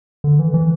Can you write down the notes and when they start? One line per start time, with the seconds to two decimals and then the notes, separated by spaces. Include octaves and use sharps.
0.24 D3
0.39 E3
0.54 E3